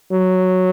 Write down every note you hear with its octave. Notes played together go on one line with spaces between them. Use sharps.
F#3